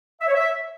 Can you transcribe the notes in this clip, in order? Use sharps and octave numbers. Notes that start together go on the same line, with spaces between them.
E5
C#5
E5